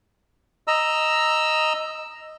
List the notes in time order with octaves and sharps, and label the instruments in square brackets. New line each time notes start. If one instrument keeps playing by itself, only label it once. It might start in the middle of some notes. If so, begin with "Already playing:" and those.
[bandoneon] D#5 A#5 E6